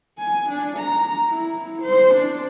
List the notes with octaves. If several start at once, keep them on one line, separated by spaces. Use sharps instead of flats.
G#5
D4
A#5
E4
C5
D4